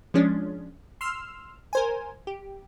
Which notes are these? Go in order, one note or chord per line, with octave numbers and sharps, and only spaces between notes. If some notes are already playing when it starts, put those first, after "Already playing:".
F3 G#3 C#4 D4
C6 E6 F6
A#4 C5 G#5
G4